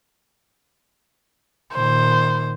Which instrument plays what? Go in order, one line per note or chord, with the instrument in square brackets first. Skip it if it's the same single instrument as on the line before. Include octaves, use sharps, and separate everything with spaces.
[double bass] A#2 D#3 [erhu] C5